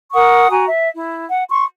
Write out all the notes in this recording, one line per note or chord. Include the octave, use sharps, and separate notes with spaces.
A#4 F#5 C#6 D#6
F#4 G#5 A#5
E5
E4
F#5
C6 C#6